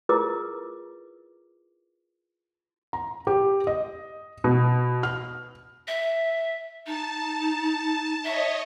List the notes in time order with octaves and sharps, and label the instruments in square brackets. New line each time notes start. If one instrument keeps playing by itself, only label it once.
[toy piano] E4 F4 G#4 A#4 B4 D6
[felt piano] A#5
G4
D#5
B2
F6
[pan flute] E5
[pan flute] D#4 [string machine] A5
[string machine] C#5 D#5 [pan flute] E5